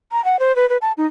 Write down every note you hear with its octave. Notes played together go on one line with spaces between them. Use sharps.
A#5
F#5
C5
B4
B4
A5
D#4